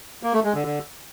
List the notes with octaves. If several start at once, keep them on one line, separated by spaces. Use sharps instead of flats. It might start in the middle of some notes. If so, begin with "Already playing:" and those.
A#3
A3
G#3
D3
D3